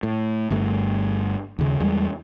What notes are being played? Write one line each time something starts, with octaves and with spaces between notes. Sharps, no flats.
A2
G1 G2 A3
D#2 C#3
E2 G3 G#3